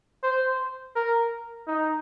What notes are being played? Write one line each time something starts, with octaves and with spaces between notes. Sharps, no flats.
C5
A#4
D#4